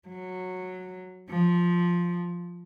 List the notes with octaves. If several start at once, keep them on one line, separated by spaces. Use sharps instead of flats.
F#3
F3